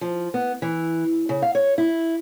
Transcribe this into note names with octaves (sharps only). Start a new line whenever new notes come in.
F3
B3
E3
C#3
F5
C#5
E4